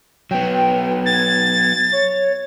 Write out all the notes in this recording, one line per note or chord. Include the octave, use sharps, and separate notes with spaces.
F#3 B3 G5
G#6 A6
C#5